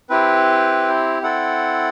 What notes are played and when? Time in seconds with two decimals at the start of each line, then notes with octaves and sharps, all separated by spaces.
0.10 C4 E4 G4 B4
1.22 C4 E4 A4 F#5